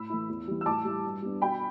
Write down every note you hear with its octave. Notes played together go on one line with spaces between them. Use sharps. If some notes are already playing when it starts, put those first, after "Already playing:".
Already playing: A2 B5 E6
E3 A3 E4
E2
E3 G3
E6
A2 A5 D6
G3 E4
G2
G3 B3 D4
B2 G5 B5